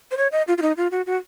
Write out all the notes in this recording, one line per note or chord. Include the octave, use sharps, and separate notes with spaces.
C5
C#5
D#5
F4
F4
D#4
F4
F#4
F#4